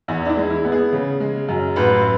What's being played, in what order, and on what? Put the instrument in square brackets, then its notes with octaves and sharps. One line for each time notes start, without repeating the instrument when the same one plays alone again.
[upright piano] E2 E4
D4
E4
G#3
E4
B3
G#4
C#3
G#3
F#2
A1 B4